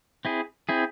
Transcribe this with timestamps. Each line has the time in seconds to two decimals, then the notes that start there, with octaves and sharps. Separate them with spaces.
0.25 C4 E4 G#4
0.69 C4 E4 G#4